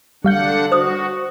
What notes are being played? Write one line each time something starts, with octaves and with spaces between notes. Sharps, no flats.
D3 G3 D4 F5 F#5 G6
F#4 C5 D#6